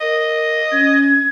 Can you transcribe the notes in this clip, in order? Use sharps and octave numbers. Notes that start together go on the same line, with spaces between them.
A#4 D#5
C#4 G#6